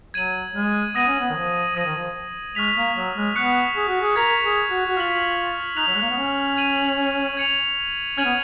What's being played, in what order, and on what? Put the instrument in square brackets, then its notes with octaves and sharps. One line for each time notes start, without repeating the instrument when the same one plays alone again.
[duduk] F#3 [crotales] G#6 D#7 F#7
[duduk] G#3
[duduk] B3 [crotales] D#6 A#6 D#7 F#7
[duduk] C#4
B3
D#3
F3
[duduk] F3 [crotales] D#6 A#6 D#7
[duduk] D#3
F3
[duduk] G#3 [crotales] C#6 F6 B6 F7
[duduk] A#3
F#3
G#3
[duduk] B3 [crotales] C#6 F#6 C#7
[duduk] G#4
F#4
G#4
[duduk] A#4 [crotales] C#6 G#6 B6 F7
[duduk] G#4
F#4
F#4
[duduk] F4 [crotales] F6 B6 F#7
[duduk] D#4 [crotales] F#6 B6 F7
[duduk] F#3
G#3
A#3
B3
C#4
[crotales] G#6 D#7 F#7
G#6 C#7 F7
[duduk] C#4 [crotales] F6 G#6 D#7 F#7
[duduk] B3